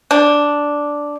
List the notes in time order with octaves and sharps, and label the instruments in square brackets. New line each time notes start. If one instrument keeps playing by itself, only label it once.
[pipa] D4